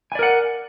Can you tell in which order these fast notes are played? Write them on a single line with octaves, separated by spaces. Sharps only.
G#5 D5 A#4 F#5